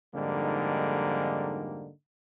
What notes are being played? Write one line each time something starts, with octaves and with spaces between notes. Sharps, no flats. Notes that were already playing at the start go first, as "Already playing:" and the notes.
F2 G#2 D3 G3 A#3 D#4